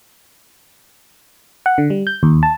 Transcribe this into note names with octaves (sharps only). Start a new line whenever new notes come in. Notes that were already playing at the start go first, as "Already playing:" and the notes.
F#5
D3
G3
G6
D#2
A5